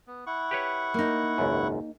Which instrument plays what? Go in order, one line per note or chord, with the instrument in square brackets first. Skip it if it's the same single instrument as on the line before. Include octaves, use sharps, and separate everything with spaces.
[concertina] B3
E4 F#5 C#6
[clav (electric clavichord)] G4 B4 C#5
[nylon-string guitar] A#3 D#4
[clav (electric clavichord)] G#1 C#2 F#2